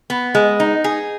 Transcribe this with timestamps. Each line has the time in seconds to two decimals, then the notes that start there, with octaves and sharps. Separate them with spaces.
0.10 B3
0.35 G#3
0.60 D#4
0.84 G#4